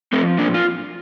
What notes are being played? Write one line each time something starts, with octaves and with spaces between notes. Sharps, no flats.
F3 A3 C4
A#2 A#3 D4
F4